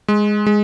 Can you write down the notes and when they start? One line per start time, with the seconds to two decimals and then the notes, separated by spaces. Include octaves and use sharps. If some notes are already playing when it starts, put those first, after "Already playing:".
0.08 G#3
0.46 G#3